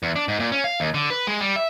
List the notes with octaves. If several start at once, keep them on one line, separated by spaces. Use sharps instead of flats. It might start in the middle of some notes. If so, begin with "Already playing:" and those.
E2
D4
G#2
A#2
C#4
F5
D#2
D3
B4
G#3
G3
E5